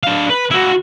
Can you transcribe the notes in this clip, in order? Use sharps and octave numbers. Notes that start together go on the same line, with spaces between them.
D4 F5
B4
E4 F#4